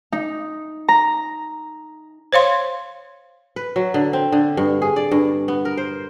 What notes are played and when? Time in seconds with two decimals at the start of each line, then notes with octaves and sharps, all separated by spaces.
0.12 D#4
0.88 A#5
2.33 C5 C#5 F5 C6
3.56 B4
3.76 F#3
3.94 D3
4.13 C4
4.32 D3
4.57 G2
4.82 G#4
4.96 D5
5.11 G2
5.48 B3
5.65 A#4
5.77 C5